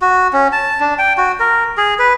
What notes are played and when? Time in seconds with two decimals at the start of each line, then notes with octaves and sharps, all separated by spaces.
0.02 F#4
0.33 C#4
0.52 A5
0.80 D4
0.99 G5
1.18 F#4
1.40 A#4
1.78 G#4
1.99 B4